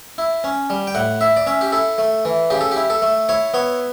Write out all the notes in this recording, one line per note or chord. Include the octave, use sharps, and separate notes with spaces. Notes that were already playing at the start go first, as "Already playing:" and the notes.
E4
C#4
G3
G5
A2 F#5
E4 E5
D5
C#4 E5
G4
E4 A4
A3
E3
C#3 G4
A4
E4 G4
A4
A3
E4 C#5
B3 C#5